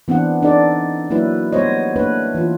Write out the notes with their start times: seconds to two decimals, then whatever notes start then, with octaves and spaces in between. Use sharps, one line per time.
0.08 E3 B3 C4 D4 F#5
0.43 D4 D#4 A4 D5
1.10 F#3 A#3 E4 B4
1.53 G3 A3 B3 C5 C#5 D#5
1.96 A3 A#3 D4 B4 C#5
2.35 E3 F4